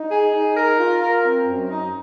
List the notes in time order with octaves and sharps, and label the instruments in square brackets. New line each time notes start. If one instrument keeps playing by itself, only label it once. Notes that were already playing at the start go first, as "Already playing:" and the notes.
Already playing: [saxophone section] D#4
G#4
D#4
A#4
F4
A#4
C4
F#2
D#4